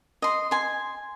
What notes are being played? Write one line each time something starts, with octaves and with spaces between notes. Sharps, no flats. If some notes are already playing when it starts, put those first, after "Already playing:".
D#5 C6
G#5 C6